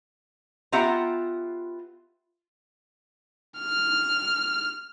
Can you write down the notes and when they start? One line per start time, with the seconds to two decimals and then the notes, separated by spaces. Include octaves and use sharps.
0.72 B3 F4 G4 E5 F#5 A#5
3.59 F6